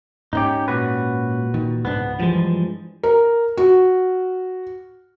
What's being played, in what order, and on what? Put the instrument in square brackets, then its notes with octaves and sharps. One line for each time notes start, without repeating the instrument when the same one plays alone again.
[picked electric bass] G#2 C4 C#4 [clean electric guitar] D#4 G4
[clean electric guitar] A#2 F#4 B4
[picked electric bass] D#3
[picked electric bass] C#2 G#2 D4 [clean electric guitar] B3
[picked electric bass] G2 E3 [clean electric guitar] F3 G#3
[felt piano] A#4
F#4